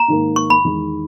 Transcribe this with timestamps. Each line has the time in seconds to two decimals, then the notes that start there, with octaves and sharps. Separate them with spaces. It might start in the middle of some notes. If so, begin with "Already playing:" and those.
Already playing: A#5
0.08 G#2 D#3 A#3
0.36 C#6
0.50 B5
0.65 E2 D#3 G#3 D#4